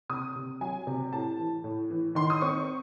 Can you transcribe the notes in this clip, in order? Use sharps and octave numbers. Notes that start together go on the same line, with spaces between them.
C3 D#6
C3
F#3 G#5
C3
A2 A5
E3
A2
E3
D#3 C6
D#6
C4 C#6